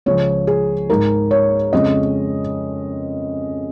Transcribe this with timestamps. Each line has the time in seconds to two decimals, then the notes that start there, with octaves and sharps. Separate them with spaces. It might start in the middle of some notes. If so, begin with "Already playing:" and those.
0.06 C#2 C#3 F3 C#5
0.47 G#4
0.90 G#2 G#3 D#4 A#4
1.31 C#5
1.73 F2 C#3 G#3 C#4 D#5